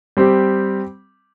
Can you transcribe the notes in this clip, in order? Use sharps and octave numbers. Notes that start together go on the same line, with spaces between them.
G3 C4 G4